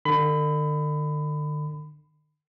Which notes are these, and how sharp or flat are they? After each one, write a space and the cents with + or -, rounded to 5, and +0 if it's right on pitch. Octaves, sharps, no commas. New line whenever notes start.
D3 +45 B5 +25